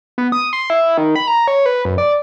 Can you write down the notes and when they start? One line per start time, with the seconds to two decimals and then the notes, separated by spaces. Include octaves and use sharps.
0.18 B3
0.32 D#6
0.53 C6
0.70 E4
0.98 D#3
1.16 B5
1.27 A#5
1.48 C#5
1.66 B4
1.85 F#2
1.98 D5